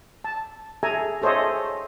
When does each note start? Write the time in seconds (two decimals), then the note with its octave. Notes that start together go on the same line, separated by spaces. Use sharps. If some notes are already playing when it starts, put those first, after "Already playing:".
0.24 A5
0.83 G#4 A4 E5 G#5 A#5
1.22 G#4 A4 C5 C#5 D#5 E5